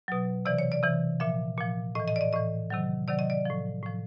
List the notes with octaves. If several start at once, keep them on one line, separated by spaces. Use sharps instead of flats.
B2 F#3
C3 E3 D5
C#5
D5
C3 E3
A#2 F3 E5
A#2 F3
A2 E3 D#5
D#5
D5
D#5
A2 E3 D#5
C3 D#3 F#3
C3 D#3 F#3 D5
D#5
D5
A2 F3
A2 F3